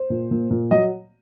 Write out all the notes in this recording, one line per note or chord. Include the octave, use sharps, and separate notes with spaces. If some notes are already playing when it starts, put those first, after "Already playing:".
Already playing: C5
A#2
A#2
A#2
F#3 D#5